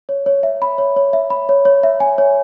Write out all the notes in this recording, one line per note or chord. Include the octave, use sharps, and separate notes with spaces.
C#5
C#5
E5
B5
C#5
C#5
E5
B5
C#5
C#5
E5
G#5
C#5